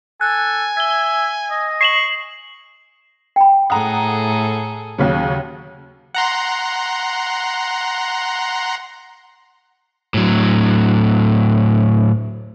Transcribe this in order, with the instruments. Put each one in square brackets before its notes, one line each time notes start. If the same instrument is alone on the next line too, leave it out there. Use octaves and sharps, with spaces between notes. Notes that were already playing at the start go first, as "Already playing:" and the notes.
[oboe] A4 [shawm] G#5 [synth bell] F#6
[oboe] E5 [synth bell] G#6 G7
[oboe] D#5
[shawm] C#6 [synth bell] C7 E7 F#7
[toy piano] G5 B5
[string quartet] A2 G#4 A4 [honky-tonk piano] F#5 A#5 [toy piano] D#6
[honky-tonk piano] D#2 C#3 F#3
[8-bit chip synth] F#5 A#5 C6
[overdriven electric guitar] A2 F#3